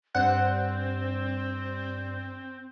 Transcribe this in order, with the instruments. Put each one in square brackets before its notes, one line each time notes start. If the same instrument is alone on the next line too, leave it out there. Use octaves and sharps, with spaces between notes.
[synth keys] G2 C5 D5 [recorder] C4 [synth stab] F#5